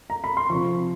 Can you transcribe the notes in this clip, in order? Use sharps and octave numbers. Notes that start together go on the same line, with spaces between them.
A#5
B5
C6
C3 F3 C#6